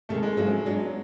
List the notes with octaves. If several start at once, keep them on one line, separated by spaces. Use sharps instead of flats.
C3 D#3 G#3 A3
G#3
G#2 F3 F#3 A3 C#4
F#3 G#3 B3 D4